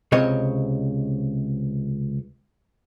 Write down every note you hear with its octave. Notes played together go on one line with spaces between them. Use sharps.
C#2 C3 C4 C#5 D#5